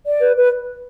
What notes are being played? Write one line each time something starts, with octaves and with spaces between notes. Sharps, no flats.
D5
B4
B4